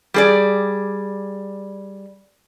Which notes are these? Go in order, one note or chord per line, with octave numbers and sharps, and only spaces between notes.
G3 G#4 D5